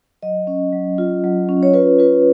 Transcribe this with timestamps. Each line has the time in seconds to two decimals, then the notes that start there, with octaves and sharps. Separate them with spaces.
0.23 F#3 D#5
0.47 C#4
0.73 F#3
0.98 F4
1.24 F#3
1.49 C#4
1.63 C#5
1.74 F4 B4
1.99 F4 B4